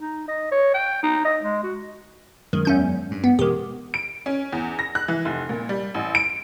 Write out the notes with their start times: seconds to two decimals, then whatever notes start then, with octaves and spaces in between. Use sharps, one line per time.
0.01 D#4
0.28 D#5
0.52 C#5
0.74 G5
1.03 D#4
1.25 D#5
1.43 G#3
1.63 F#4
2.53 F#2 D#3 G#3
2.65 E2 C#4 G6
3.11 G2
3.24 B3
3.39 E1 D#3 G#3 G4
3.94 D7
4.26 C#4
4.53 E2
4.79 A#6
4.95 F#6
5.08 E3
5.25 F1
5.49 A#2
5.69 G3
5.94 A1
6.15 D7